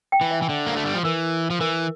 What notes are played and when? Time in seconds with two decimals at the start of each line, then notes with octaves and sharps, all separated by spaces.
0.12 G5
0.21 E3
0.31 E5
0.42 E3
0.49 D3
0.67 A#3
0.76 A3
0.86 G3
0.95 F3
1.04 E3 A#4
1.50 F3
1.61 E3 A#4